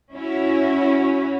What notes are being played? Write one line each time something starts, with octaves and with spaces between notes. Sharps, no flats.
C#4 E4 F#4